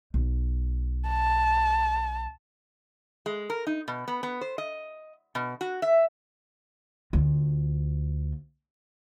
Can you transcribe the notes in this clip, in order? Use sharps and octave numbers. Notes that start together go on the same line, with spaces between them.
B1
A5
G#3
A#4
D#4
B2
B3
B3
C5
D#5
B2
F#4
E5
D2 F4